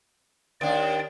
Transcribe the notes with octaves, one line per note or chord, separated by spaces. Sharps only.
D#2 D4 D5 G5